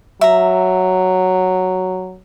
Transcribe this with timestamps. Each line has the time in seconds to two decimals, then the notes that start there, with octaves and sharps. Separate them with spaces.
0.21 F#3 E5 A#5